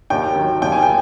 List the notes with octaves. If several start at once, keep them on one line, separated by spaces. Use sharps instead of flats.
D#2 G5
D#3 F#3
D#2 G5
G#5
G5